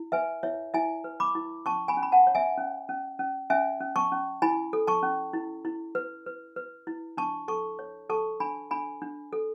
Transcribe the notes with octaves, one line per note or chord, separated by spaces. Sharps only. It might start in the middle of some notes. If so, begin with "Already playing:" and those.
Already playing: E4
B4 E5 G#5
E4 C#5 E5
E4 E5 G#5
B4
B5 D6
E4
C#4 A5 C#6
G#5 B5
C#4
B5
F#5 A5
C#5
E5 G#5
C#4
C#4
C#4
C#4 E5 G#5
C#4
A5 C#6
C#4
E4 G#5 B5
A4
A5 C#6
C#4
E4
E4
B4
B4
B4
E4
D4 A5 C#6
A4 A5 C#6
C#5
A4 A5 C#6
D4 G#5 B5
D4 G#5 B5
D4
A4